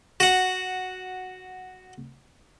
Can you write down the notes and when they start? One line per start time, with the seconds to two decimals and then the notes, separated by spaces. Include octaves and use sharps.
0.20 F#4 F#5